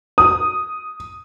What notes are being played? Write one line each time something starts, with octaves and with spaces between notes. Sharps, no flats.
D#6